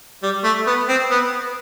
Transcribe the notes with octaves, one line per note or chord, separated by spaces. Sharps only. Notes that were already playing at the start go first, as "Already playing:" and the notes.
G3
A3
B3
C4
B3